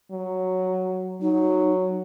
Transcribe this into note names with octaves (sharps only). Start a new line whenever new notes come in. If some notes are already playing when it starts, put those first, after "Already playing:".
F#3
F#3 D#4